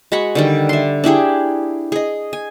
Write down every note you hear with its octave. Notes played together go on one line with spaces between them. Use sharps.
G#3 F#4 B5 C#6
D3 D#3 G3
E5 C6
D4 E4 G4 G#4
G#4 D#5
G#5